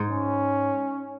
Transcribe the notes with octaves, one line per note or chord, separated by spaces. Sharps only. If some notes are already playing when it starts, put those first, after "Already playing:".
Already playing: G#2
C#4